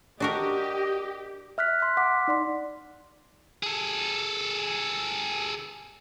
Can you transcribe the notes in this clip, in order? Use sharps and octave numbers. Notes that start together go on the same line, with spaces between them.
D4 F#4 G4 A#4 D#5
E5 F6 F#6 B6
C6 F#6
F#5 D6 B6
D#4 D5 C6
G#4 A4